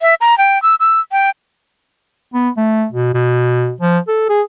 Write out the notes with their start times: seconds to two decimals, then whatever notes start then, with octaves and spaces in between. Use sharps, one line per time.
0.01 E5
0.21 A#5
0.38 G5
0.63 E6
0.80 E6
1.12 G5
2.34 B3
2.57 A3
2.93 B2
3.14 B2
3.81 F3
4.08 A4
4.29 G#4